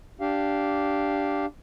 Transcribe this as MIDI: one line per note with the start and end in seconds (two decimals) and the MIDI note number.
0.21 1.46 62
0.21 1.46 67
0.21 1.46 77